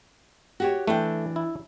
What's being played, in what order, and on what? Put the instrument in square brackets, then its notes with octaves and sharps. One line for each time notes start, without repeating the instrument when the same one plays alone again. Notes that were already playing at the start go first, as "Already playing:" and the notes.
[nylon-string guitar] F#4 G4 C#5
[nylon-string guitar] E3 D4 G5 [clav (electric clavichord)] A3
[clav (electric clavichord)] E4